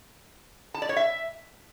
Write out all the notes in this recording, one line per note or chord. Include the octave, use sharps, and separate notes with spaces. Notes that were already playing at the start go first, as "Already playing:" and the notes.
A5
D5
C#5
E5